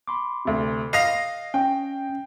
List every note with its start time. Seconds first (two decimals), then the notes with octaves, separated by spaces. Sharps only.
0.07 B5 C6 D6
0.45 D2 C3
0.93 D#5 F5 A#6 C7
1.54 C#4 G5